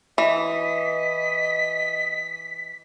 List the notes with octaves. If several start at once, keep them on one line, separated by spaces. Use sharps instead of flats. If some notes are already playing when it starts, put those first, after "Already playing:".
E3 D#5 B6